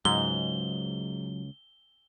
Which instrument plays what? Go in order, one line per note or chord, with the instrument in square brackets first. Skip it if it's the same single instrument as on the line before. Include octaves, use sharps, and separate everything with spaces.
[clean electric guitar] C#2 [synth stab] G#2 [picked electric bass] F#3 [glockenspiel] G7